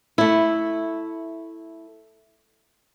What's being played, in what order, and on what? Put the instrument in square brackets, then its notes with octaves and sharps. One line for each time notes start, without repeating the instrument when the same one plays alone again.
[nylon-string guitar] A3 E4